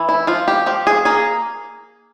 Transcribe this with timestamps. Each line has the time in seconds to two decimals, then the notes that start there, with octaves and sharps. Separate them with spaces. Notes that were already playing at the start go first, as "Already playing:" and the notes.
Already playing: E3
0.09 E4
0.27 F3 F4
0.48 G4
0.66 F3 G4
0.87 G#4
1.05 A#3 G#4